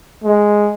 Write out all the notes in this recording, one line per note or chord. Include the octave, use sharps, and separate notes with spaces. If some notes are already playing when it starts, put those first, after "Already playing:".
G#3